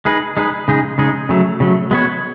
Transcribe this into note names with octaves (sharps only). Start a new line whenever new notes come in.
G#3 D#4 G#4 B4
G#3 D#4 G#4 B4
C#3 G#3 D#4 G#4
C#3 G#3 D#4 G#4
C#3 F#3 A3
C#3 F#3 A3
G#3 B3 F#4 C#5